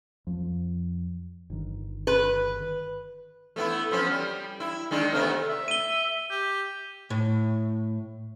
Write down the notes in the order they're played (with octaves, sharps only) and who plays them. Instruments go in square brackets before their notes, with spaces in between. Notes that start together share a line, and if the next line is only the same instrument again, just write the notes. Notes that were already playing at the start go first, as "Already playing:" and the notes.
[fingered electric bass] F2
G1 D#3
[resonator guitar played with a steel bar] B4
[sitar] A3 B3 E4
F3 B3 C#4
G3
E4
D#3 G#3 D4
C3 A3 B3
[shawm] E5
[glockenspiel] D#7 G7
[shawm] G4
[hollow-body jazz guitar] A2